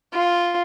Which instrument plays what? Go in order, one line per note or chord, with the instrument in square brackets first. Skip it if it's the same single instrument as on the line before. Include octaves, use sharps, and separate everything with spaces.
[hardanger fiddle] F4